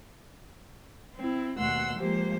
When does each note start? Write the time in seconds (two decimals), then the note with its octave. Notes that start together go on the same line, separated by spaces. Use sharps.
1.15 C4 E4
1.57 D#2 B2 A3 F#5 C6 E6
1.97 F3 G#3 A#3 G4 C5